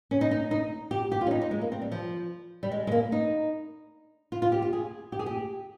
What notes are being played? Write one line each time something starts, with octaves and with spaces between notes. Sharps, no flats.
C#4
D#4
D#4
D#4
G4
G4
F4
C#4
D#4
D#4
G#3
A#3
C4
G3
F3
G3
G#3
G#3
A#3
D#4
F4
F4
G4
F4
G#4
G4
G#4
G4